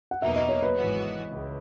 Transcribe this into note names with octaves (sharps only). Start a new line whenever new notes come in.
F#5
E2 B2 F#3 A#3 D#4 E5
D#5
C#5
B4
G#1 G#2 E3 B3 F#4
C#2